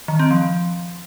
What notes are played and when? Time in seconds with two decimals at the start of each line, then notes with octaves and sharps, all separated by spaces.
0.08 D#3
0.19 C4
0.31 F3
0.42 F3